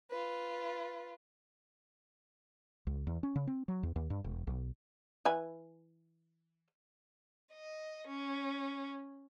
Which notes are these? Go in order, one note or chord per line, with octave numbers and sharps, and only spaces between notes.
F4 B4
C#2
E2
C#4
C#3
C4
F#3
E2
D#2
G2
E1
B1
E3 B4 G#5
D#5
C#4